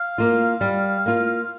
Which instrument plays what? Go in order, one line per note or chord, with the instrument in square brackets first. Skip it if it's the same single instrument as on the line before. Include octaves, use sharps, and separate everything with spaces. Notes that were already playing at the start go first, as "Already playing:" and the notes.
Already playing: [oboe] F5
[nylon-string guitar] A#3 F4
G3
A#3 F4